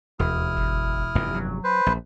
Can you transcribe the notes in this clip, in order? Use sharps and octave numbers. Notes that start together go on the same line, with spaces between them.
E1 D#2 E4 D#6 F6
G1
F1 E2 G2
F#3
B4 C5
A#1